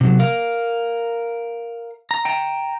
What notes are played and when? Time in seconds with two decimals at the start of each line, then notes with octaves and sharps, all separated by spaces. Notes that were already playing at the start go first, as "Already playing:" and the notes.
0.01 C3 F#3
0.19 A#4 F5
2.11 A#5
2.25 G5 A#5